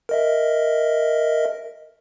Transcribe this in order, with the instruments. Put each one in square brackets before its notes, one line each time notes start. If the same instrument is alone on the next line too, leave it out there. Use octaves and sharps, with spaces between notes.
[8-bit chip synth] A#4 D#5 E5